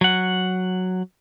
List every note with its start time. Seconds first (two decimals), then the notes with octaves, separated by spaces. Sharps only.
0.01 F#3 F#5